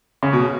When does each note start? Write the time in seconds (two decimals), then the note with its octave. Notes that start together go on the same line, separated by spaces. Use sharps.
0.23 C#3
0.33 B2